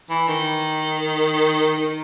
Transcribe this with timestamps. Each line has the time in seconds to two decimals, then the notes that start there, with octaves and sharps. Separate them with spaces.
0.10 E3
0.28 D#3
1.77 D#3